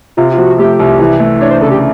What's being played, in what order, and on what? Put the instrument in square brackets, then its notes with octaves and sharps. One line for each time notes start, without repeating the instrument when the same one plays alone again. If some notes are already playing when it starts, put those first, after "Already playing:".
[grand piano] C3 [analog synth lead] F4
[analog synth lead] F4
[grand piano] F3 [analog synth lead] F#4
[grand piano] A3 [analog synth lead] G4
[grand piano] C2
E3
A3
[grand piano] D4 [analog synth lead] C#5
[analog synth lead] C5
[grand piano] C#3 [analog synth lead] A4
[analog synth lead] G4